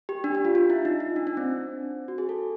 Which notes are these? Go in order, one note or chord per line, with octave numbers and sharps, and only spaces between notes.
G4
D4
D4
F4
F4
E4
D#4
D#4
D4
D4
C4
F#4
G#4
A4